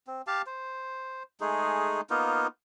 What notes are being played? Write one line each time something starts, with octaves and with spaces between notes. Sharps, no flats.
C4
G4 F5 A5
C5
G#3 A3 D#4 G#4
A#3 B3 D#4 F4